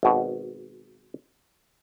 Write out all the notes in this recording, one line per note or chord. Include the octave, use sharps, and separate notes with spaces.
G#1 B2